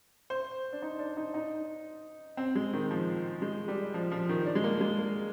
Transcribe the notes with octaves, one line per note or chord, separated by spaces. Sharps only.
C5
D4
D#4
D4
D#4
D#4
C4
G#3
D#3
F3
G#3
G3
F3
F3
D#3
D4
G#3
A#3
G#3
A#3